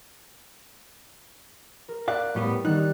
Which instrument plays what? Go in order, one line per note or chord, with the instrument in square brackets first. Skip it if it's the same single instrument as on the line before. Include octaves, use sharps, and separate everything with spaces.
[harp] A#4
[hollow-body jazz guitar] D5 F5 [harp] F#6
[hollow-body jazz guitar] A2 G3 B3
[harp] D#3 G3 F#6 [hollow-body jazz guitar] D#4